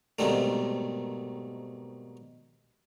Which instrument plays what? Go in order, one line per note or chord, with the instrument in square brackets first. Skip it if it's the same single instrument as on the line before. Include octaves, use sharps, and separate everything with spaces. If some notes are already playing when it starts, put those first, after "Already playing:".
[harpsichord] B1 G#2 C3 D#3 G3 A3